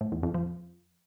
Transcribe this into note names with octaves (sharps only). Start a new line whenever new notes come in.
A2
E2
F2
F3